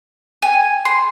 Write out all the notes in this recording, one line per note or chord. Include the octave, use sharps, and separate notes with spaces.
G#5
C6